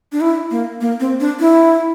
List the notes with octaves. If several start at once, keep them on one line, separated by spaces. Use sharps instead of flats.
D4
E4
A#3
A#3
C4
D4
E4